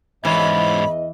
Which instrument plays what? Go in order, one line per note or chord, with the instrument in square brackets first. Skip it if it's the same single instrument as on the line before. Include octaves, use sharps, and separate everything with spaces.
[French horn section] E2 D#5 [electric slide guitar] G#2 C#4 F4 [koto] E3 [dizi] B5